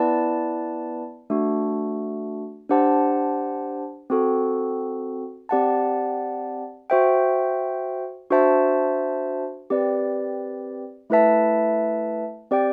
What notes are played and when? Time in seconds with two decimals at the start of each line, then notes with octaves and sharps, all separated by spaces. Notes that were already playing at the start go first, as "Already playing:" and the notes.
Already playing: B3 E4 B4 D5 A5
1.30 A3 D4 F#4
2.69 D4 G4 C5 F#5 A5
4.10 C4 F#4 A4
5.49 C4 G4 D5 F#5 A5
6.90 F#4 C5 E5 G5
8.30 D4 F#4 C5 E5 A5
9.70 C4 G4 B4 D5
11.10 A3 E4 B4 E5 A5
12.51 C4 G4 D5 G5